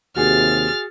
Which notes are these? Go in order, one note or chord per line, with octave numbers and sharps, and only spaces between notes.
D#2 C3 F#4 G#4 F6 A6